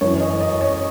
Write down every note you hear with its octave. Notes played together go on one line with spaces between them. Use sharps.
F#2 E3 C#5
D#5
D#5
C#5